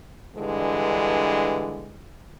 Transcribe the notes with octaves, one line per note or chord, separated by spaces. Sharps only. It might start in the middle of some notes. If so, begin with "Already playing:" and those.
G2 D3 E3 G#3